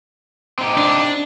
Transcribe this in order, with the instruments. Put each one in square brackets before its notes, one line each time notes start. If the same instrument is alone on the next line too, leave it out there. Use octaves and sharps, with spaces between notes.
[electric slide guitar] C4 D#4 G4
[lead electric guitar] D4